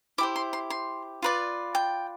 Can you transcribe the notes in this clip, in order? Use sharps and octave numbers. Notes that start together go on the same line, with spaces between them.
E4 G4 C5 D6
C6
C6
C6
F4 B4 D5
G5